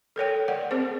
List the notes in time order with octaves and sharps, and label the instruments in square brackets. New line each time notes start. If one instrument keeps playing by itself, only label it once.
[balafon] A4 A#4 C#5 G5
A#4 D5 F#5
C4 G#4 C5